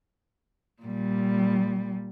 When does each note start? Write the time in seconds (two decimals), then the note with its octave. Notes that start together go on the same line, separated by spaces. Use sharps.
0.82 A#2 G3